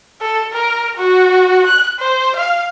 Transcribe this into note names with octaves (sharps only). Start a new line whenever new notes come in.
A4
A#4
F#4
F#6
C5
F5